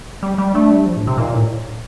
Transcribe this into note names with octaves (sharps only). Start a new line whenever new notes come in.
G3
G3
A3 D4
G3
F3
A2
C3
A#2 D#3
A2